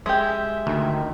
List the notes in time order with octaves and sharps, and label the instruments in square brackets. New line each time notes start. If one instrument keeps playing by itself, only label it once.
[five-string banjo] G#3 G4 [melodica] E5
[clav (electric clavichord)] D2 [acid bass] D#3